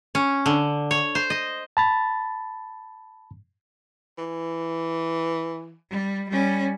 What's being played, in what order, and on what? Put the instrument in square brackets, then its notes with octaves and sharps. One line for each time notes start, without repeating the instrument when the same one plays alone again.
[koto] C#4
D3
C#5
C5
D#5
[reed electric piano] A5 B5 A6
[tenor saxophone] E3
[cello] G3
G3 C#4